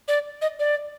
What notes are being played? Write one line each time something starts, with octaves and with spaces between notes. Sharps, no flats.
D5
D#5
D5